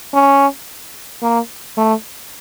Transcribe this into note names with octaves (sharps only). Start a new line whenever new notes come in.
C#4
A#3
A3